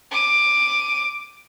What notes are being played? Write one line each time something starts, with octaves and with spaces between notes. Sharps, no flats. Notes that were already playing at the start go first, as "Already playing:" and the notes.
D6 D#7